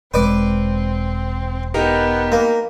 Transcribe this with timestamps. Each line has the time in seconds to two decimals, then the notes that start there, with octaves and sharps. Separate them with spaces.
0.14 E1 G#3 C4 B4 D5 D6
1.74 B3 D#4 G4 A#4
2.32 A#3